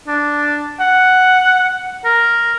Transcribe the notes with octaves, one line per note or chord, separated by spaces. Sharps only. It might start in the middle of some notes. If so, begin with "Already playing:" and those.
D4
F#5
A#4